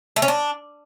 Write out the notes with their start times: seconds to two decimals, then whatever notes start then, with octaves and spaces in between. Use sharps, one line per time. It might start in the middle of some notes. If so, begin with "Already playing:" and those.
0.16 A3
0.22 C#4
0.28 D4